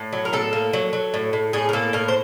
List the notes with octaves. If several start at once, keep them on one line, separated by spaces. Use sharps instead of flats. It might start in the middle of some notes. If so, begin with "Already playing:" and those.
Already playing: A2
F#3
A#4
A2 A4
A#3
F#3
F#3
A2
A2
A2 G#4
A#4
A#3 A4
A2 A#4
C5